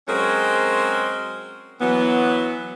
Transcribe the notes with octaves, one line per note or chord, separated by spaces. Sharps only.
F#3 G#3 C4 C#4 G#4 A#4
E3 F#3 B3